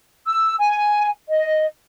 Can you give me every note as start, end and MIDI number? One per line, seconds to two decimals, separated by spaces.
0.27 0.55 88
0.60 1.09 80
1.29 1.65 75